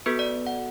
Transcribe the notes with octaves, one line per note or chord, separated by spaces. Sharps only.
B3 F#4 A4 B4
D5
F#5